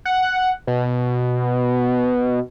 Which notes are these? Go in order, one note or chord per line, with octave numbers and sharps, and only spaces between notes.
F#5
B2